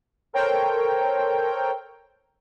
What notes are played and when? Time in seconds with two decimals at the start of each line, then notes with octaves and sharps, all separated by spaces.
0.33 A4 A#4 C5 C#5 G5